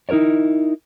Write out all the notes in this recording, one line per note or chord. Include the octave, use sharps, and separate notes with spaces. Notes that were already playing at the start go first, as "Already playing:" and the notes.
D#4 E4 A#4 C#5 D5